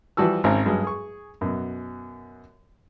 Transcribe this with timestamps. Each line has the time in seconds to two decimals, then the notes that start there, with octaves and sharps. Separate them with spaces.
0.17 E3 F3 G3 F#4 A5 E6
0.44 G#1 C4 C#4 A#5
0.66 G2 F#3 G#3
0.84 G#4 C#6
1.41 F#2 B2